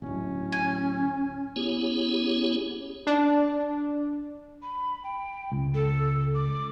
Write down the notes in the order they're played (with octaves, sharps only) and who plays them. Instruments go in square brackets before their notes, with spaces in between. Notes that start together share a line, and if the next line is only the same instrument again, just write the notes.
[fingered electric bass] D1 G#1 [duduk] C#4
[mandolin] G#5
[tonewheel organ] B3 C#4 E4 G4 G#4 C#5
[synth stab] D4
[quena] B5
G5
[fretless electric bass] C#2
[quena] A4
D6